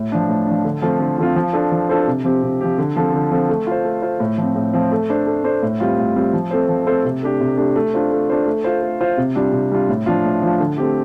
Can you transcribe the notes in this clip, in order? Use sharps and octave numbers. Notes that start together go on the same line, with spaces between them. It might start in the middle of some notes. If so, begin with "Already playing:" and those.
Already playing: A2
F3 D4
A2
F3 D4
D3
F3 A3 C4 F4
D3
F3 A3 C4 F4
F3
D4 F4 A4 C5
F3
D4 F4 A4 C5
C3
F3 C4 G4
C3
F3 C4 G4
D3
F3 C4 A4
D3
F3 C4 A4
A3
F4 C5
A3
F4 C5
A2
F3 C4
A2
F3 C4
A3
D4 A4 C5
A3
D4 A4 C5
A2
G3 C4 F4
A2
G3 C4 F4
F3
A3 C4 A4 C5
F3
A3 C4 A4 C5
C3
A3 D4 G4
C3
A3 D4 G4
A3
D4 F4 C5
A3
D4 F4 C5
A3
F4 C5
A3
F4 C5
C3
G3 D4 F4
C3
G3 D4 F4
A2
F3 D4 F4
A2
F3 D4 F4
D3
A3 C4 G4